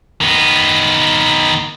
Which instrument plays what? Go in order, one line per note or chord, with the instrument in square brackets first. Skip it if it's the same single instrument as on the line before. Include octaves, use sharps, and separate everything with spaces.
[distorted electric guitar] D#3 B3